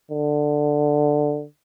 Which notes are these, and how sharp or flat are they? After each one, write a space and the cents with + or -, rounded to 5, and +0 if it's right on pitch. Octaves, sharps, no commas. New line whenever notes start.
D3 +10